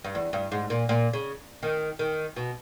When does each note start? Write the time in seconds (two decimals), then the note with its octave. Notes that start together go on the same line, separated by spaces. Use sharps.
0.04 G2
0.15 E2
0.33 G2
0.52 G#2
0.70 A#2
0.89 A#2
1.13 C#3
1.63 D#3
1.99 D#3
2.36 B2